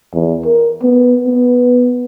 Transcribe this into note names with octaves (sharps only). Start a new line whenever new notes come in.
E2
A#4
B3
B3